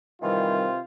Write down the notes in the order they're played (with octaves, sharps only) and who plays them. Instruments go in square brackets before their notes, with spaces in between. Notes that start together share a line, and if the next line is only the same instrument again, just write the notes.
[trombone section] C3 C4 F4 [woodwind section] D#3 E3 G3